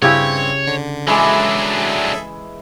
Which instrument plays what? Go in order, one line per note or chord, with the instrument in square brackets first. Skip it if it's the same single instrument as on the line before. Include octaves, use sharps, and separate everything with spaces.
[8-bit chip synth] G2 C4 [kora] C#3 E4 G4 [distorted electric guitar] C#5
[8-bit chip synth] D3
[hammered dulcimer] E3 G#3 D6 [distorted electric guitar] F#3 D4 [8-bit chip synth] G#4 A4 E5